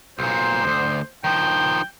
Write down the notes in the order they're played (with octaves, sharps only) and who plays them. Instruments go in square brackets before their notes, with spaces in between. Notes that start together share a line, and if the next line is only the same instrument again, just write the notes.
[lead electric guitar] B1 A#2 [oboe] C5
[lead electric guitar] D2 G2
[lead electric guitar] D#3 F3 [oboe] G5